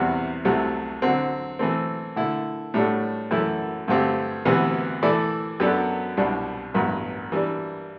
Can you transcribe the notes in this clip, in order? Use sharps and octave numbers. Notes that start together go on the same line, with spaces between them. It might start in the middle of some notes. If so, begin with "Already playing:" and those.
Already playing: E2 C3 G3 B3 F#4
C2 C3 F#3 A3
D3 F#3 C4
E3 A3 C4
D3 A3 E4
A2 G3 D4 F#4 A4
F#2 E3 A3 E4 A4
G2 D3 A3 C4 G4
D2 C3 E3 B3
E3 A3 E4 A4 D5
F#2 F#3 B3 D4 A4
C2 B2 G3 D4
A1 G2 F#3 B3 F#4
E3 G3 D4